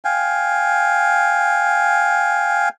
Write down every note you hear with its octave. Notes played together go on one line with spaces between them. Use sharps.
F5 G5 G#5